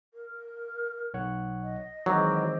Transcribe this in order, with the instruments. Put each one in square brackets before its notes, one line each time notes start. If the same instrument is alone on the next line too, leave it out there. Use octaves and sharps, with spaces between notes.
[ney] A#4
[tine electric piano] B1 C#5 F#5
[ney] D#5
[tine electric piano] D#3 E3 [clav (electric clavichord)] F#3 [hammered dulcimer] G#3 C4 D5